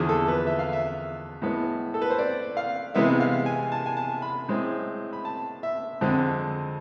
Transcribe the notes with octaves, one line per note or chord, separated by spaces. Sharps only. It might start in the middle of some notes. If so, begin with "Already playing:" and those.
Already playing: E2 D3 F3 G#4
A4
B4
E5
F5
E5
A2 G#3 B3
A4
B4
C5
D5
F5
C3 E3 G#3 B3 E5
F5
G#5
A5
G#5
A5
B5
A2 G#3 C4
B5
A5
E5
F2 D3 G#3 C4